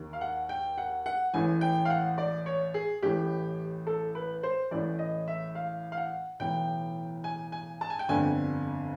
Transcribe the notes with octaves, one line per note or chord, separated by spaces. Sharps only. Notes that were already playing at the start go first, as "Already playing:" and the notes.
Already playing: D#2 D#3
F5
F#5
G5
F#5
F#5
A1 A2 E3 G#5
G5
F5
F#5
D5
C#5
G#4
A1 A2 E3 G4
A4
B4
C5
A1 A2 E3 D5
D#5
E5
F5
F5
F#5
B1 A2 E3 G5
G#5
G#5
A5
G#5
G5
G1 F2 D3 G#5